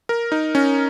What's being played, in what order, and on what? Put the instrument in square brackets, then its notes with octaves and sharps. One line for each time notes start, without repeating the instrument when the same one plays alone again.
[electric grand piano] A#4
D#4
C#4